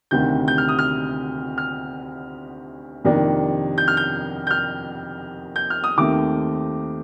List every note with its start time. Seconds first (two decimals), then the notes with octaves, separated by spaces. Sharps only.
0.11 D2 C3 D#3 G6
0.48 G6
0.58 F6
0.69 D#6
0.79 F6
1.58 F6
3.05 F2 C3 D#3 A#3 D4
3.78 G6
3.88 F6
3.97 G6
4.47 G6
4.51 F6
5.56 G6
5.70 F6
5.84 D#6
5.97 D#2 D#3 A3 C4 D6